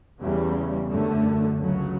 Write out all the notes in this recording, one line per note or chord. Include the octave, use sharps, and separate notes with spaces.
E2 C#3 G3
F#2 D3 A3
C#2 C#3 F#3